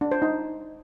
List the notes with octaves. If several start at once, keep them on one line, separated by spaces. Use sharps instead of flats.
D4
C5
D#4